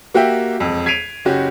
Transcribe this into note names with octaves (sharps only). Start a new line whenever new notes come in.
A#3 F#4 G4 E5 G5
E1 F2
G#6 B6 C7 D7 D#7 F7
F#1 C#4 F#4 G4